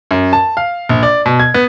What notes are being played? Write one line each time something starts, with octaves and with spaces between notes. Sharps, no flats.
F#2
A5
F5
A#1
D5
B2
G#6
B3